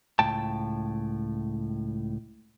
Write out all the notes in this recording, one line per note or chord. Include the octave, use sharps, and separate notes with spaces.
C#2 A2 G5 A5